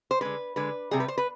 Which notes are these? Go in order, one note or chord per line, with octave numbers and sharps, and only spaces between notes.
C5
D3 G#3 B4
D3 G#3 B4
C3 G3 G#4
B4
C5
B4